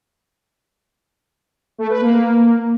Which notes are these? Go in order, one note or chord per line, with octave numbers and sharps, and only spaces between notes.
A3
B4
A#3